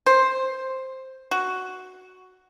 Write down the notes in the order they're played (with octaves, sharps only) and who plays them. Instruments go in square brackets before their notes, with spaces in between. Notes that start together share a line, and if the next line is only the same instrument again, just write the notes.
[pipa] C5
F#4